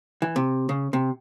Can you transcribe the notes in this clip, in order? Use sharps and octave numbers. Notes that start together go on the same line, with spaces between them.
E3
C3
C#3
C3